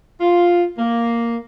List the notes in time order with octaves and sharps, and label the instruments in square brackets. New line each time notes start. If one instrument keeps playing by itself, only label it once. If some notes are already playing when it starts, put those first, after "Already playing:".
[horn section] F4
A#3